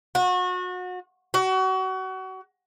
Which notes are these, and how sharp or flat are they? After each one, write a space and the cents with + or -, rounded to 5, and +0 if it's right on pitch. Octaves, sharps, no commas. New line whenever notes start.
F#4 -30
F#4 +30